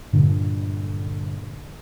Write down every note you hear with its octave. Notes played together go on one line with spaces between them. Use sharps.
G2 A#2 D3